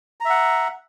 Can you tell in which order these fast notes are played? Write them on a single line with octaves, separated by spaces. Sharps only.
A#5 E5 F#5